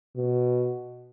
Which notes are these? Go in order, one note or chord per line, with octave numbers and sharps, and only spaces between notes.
B2